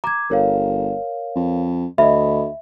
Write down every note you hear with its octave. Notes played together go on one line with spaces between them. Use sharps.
A#5 D6 G#6
G1 A#4 C#5 F5
F2
D2 D#5 E5 B5